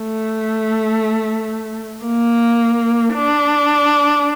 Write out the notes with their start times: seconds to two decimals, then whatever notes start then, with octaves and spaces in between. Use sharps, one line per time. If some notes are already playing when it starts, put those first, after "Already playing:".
Already playing: A3
2.06 A#3
3.14 D4